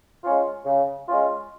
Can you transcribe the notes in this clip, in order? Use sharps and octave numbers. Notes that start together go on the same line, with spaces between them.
G#3 C#4 F4
C#3
G#3 C#4 F4